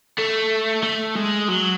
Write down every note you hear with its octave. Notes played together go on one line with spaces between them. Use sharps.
A3
A3
G#3
F#3